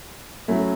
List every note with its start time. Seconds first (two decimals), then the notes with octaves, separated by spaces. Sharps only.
0.48 F#3 A3 C#4 E4